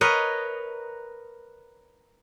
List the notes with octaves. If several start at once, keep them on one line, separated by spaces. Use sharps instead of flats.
A#4 B4 C#5 D#5